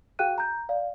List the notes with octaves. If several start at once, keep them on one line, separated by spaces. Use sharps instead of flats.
F#4 G#4 F5 G5 F#6 D#7
A#5 G6
D5 F5